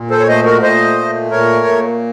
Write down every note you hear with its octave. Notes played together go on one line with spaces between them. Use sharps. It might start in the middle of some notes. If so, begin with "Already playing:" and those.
Already playing: A#2
A4 C5
C#5
A3 C5 D#5
F#4 A#4
A#2 C5 D#5
A3
A#2 A#4 C#5
A#2